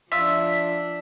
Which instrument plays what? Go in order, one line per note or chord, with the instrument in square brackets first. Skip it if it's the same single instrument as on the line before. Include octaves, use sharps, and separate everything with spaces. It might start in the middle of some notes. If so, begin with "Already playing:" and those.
[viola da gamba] F3 D4 [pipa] F4 E5 [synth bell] E6 B6